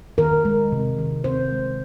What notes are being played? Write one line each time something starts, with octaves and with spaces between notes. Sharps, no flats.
D#3 A#4
G#3
C3
D#3
C4 C5
G#3